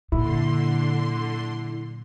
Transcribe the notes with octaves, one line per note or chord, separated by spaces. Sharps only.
F#2 A#2 D3 E4 C6